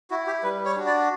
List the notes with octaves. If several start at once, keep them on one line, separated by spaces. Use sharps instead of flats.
E4 F#4
G4
G3 B4
C#5
D4 F#4
D5